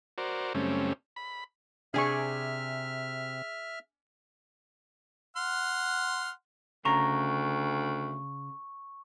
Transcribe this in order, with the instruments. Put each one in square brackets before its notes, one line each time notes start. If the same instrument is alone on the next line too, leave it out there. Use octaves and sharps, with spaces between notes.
[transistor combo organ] F#4 A#4 C5 D5
F#2 C#3 G3 A3 C4 C#4
B5
[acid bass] C3 [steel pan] D4 G#5 C#6 [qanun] G#4 D5 [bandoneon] E5 F6
[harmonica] F#5 C6 F6
[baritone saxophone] D2 [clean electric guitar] C#3 A#5 [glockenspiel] C#6